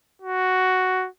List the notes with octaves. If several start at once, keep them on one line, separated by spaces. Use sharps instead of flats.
F#4